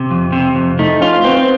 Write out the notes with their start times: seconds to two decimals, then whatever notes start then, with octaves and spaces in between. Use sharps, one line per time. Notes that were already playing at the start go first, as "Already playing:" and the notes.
Already playing: C3
0.11 F2
0.32 C3
0.55 F2
0.79 A3 D#4
1.01 C#4 F4
1.24 B3 C4